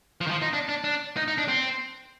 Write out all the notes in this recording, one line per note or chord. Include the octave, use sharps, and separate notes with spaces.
F3
D#3
F3
D#4
D4
D4
D4
D#4
D#4
D4
C4